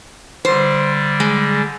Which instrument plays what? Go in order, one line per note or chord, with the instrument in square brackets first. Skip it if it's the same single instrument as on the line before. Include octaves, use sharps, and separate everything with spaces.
[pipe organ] D3 G3 [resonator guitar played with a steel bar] C5
[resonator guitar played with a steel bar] G#3